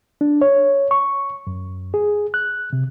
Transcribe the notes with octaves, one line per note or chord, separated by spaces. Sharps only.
D4
C#5
C#6
F#2
G#4
F#6
C3